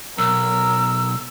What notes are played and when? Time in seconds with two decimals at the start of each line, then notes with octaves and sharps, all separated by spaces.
0.18 B1 A#4 E6